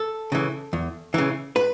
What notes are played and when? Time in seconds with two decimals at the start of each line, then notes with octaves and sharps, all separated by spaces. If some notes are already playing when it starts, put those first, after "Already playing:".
Already playing: A4
0.32 C#3 E3
0.73 E2
1.14 C#3 E3
1.56 B4